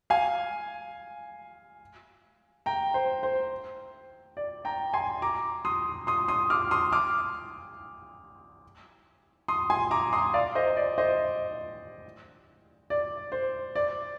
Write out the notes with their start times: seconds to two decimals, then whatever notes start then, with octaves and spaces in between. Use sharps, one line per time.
0.10 F5 G#5
2.66 G5 A#5
2.94 C5
3.23 C5
4.37 D5
4.65 G5 A#5
4.94 G#5 C6
5.22 A#5 D6
5.65 C6 D#6
6.07 C6 D#6
6.28 C6 D#6
6.50 D6 F6
6.71 C6 D#6
6.92 D6 F6
9.48 C6 D#6
9.70 G#5 C6
9.91 A#5 D6
10.13 C6 D#6
10.34 D5 F5
10.55 C5 D#5
10.77 D5
10.98 C5 D#5
12.90 D5
13.32 C5
13.75 D5